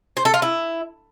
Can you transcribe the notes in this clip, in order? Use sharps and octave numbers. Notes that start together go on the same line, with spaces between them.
C5
A4
F4
E4